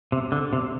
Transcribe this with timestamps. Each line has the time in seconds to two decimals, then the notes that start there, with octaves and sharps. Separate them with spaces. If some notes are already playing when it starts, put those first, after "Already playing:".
0.12 C3
0.32 D3
0.53 C3